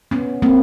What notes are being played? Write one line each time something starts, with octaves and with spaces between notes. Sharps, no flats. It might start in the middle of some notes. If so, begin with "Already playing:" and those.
B3 C#4
A#3 C4